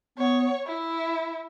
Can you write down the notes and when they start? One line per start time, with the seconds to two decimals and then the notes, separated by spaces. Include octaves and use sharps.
0.18 B3 C#5
0.66 E4